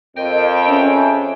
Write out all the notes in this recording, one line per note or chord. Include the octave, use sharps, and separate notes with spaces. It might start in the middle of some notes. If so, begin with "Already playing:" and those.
F2 A#4 D#5 G5
C#4 G#4 E5 A5